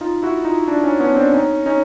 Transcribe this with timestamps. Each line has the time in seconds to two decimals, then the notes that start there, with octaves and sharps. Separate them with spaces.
0.01 D#4 F4
0.23 E4 F#4
0.45 D#4 F4
0.67 D4 E4
0.84 C#4 D#4
1.00 B3 C#4
1.16 C4 D4
1.33 C#4 D#4
1.66 C#4 D#4